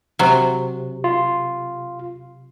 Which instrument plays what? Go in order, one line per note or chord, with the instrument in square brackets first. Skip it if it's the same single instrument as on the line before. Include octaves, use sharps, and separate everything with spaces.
[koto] C3 F#3
[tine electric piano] F4